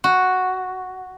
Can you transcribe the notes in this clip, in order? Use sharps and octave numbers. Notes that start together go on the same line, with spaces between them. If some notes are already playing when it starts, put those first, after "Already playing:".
F#4